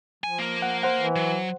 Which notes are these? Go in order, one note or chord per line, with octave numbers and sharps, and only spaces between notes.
F3 G#5
A#3 A#4
F#5
C5 F#5
E3
F#3